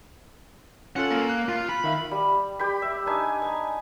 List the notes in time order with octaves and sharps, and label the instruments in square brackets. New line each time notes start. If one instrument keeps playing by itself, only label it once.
[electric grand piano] C#4 F4 A4 [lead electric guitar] F#5
[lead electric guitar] A#3
[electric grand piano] F#6
[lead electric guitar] F4
B5
[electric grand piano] D#3 E5 F5
[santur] G3
G4 G5 B5
E5
D4 D#4 G#5
G#5 A#5